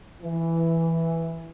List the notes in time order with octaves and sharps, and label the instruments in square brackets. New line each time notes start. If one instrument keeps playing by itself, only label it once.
[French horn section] E3